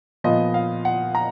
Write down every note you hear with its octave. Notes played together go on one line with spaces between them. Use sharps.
A#2 F3 B3 D#5
F5
F#5
A#5